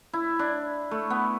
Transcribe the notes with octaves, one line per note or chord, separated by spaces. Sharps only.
E4
D4
A3
B3